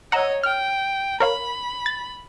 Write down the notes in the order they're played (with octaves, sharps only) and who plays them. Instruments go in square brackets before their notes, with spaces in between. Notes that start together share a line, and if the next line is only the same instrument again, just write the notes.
[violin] C#5 D#5 [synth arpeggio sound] F#5 A#5 E6
[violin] G5 [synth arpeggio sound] F6
[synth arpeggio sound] A#4 C#5 F5 [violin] B5
[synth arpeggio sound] A6